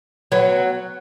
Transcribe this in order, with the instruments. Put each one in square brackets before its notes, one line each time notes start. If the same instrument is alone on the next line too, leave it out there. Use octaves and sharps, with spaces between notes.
[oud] F#3 B3